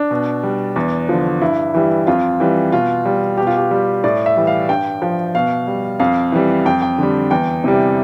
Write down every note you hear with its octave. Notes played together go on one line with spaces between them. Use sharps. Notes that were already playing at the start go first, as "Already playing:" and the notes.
Already playing: D4
B2
G3
E2
D3 F3
G2 E4
E3 G3
F2 F4
E3 G3
B2 F4
G3
B2 G4
F4
G4
G3
A2 D5
E5
E3 G3
F5
G2 G5
F3
B2 F5
G3
F2 F5
E3 G3
F2 G5
G5
D3 G3
E2 G5
C3 E3 G3